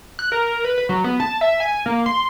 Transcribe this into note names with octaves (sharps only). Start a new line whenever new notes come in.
F#6
A#4
B4
B4
F#3
B3
A5
E5
G#5
A#3
C6